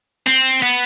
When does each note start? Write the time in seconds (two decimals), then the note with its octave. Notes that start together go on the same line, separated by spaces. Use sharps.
0.27 C4
0.62 B3